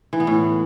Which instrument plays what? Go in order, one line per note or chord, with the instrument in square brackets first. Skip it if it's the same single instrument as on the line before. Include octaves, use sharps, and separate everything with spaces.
[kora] E3
B3
A2